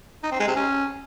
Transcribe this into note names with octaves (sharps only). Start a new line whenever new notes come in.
D#4
C4
G#3
C3
C#4